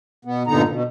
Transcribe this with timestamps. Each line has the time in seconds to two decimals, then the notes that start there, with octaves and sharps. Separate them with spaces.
0.25 B2 B3
0.47 G2 A#2 D3 B3 D#4 A#5
0.69 B2